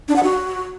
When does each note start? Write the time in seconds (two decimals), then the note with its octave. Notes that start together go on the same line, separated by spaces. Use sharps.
0.08 D4
0.16 F#5
0.23 F#4